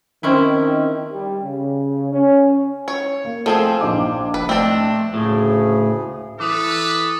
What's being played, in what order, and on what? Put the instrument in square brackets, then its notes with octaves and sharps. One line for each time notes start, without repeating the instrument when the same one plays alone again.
[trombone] D#3 [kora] C4 C#4 E4
[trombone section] G3
C#3
C#4
[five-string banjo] C#5
[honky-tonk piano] A#3
[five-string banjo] F3 C4 G#4 [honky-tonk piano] A3
[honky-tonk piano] A#1 D#4 D6
[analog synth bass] F1 [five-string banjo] B4
[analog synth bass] A3 [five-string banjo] C4 D4
[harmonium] D2 C#3 G#4 [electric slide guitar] A2
[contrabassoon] E3 [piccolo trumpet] A4 [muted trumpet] B4 [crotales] D6 D#6